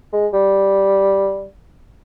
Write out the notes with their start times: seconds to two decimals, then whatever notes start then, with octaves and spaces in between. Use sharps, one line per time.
0.13 G#3
0.34 G3